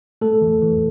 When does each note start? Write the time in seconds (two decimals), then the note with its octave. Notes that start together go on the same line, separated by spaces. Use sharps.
0.21 A3 A4
0.41 E3
0.62 E3